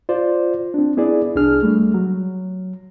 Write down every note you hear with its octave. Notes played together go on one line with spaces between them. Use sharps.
F4 C5 D5
C4 D4
B3 E4 G#4 D5
C2 D4 G#4 F6
G3 A3
F#3